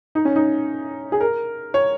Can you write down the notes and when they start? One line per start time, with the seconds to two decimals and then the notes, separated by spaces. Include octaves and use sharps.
0.15 D#4
0.25 C#4
0.36 D#4
1.12 G#4
1.21 A#4
1.74 C#5